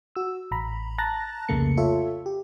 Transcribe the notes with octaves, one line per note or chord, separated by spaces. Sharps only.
F#4 E6
A1 A#5 B5
A5 A#5 F#6 A6 A#6
C2 F2 C#3 A3 A#3 C#7
F4 A4 C#5 E5
G4